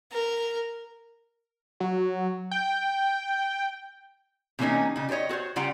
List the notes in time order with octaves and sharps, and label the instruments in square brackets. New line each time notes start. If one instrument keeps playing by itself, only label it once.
[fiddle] A#4
[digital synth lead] F#3
G5
[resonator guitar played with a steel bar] C3 E3 A3 A#3 C#4 D#4
C#3 D#4
G4 A4 C5 C#5 D#5
F#4 A4 C5 C#5
C#3 G3 F4 F#5 G5 A#5